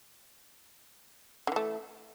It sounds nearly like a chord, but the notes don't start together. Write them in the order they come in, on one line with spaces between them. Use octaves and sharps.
D3 E3 A3